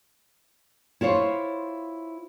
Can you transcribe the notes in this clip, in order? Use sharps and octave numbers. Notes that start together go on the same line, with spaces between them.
E4 F4 C5 C#5